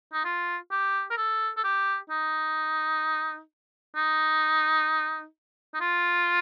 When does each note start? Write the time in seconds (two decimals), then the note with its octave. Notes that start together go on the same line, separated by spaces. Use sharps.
0.13 D#4
0.25 F4
0.71 G4
1.10 A#4
1.17 A4
1.57 A4
1.64 G4
2.10 D#4
3.95 D#4
5.74 D#4
5.80 F4